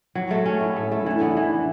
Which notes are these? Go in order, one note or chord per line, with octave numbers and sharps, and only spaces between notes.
F#3 F#4
A3
C#4
A2 E4
A3
A3
E4
E3 D4
B3 A4
D4
E3 E4